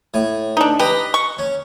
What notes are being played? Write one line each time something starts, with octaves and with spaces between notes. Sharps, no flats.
A2 G#5
D4 D#4
G4 B4 D#5 A#5
C#6
C#4